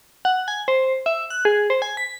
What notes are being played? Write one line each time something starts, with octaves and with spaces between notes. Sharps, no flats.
F#5
G#5
C5
E5
F#6
G#4
C5
G#5
B6